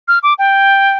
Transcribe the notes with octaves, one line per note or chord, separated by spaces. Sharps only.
F6
D6
G5